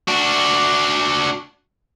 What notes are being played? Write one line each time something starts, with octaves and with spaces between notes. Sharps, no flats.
D4 F#4